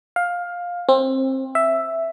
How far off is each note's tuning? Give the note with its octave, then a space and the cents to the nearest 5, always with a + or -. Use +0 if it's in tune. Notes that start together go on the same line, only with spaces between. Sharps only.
F5 +15
C4 +25
E5 +5